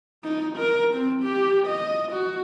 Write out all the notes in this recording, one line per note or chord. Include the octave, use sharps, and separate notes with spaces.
D#4
A#4
C4
G4
D#5
F#4